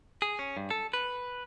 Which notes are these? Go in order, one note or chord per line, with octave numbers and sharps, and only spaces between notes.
G#4
C#4
G2
A4
B4